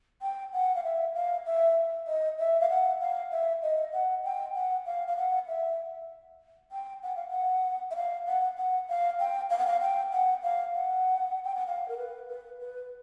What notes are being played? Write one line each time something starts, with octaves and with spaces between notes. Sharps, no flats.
G5
F#5
F5
E5
F5
E5
D#5
E5
F5
F#5
F5
E5
D#5
F#5
G5
F#5
F5
F5
F#5
E5
G5
F#5
F5
F#5
E5
F5
F#5
F#5
F5
G5
F5
F#5
F5
G5
F#5
F5
F#5
G5
F#5
F5
A#4
B4
B4
B4